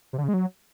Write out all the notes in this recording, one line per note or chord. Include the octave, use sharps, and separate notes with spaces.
C3
D3
C#3
G#3
F#3